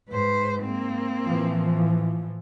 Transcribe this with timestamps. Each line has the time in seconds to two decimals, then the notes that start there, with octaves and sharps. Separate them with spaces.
0.10 G#2 B4 C5
0.64 A#3 C4
1.26 A2 E3 F3